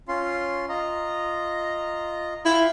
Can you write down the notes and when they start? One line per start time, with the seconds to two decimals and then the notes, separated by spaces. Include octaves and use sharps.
0.08 C#4 F4 C6
0.69 F4 D#5 A#5
2.46 E4 F4 F5 G5